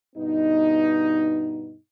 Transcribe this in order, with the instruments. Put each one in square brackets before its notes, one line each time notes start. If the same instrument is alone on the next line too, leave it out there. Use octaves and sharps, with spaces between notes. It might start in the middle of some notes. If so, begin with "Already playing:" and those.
[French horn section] G2 B2 B3 D#4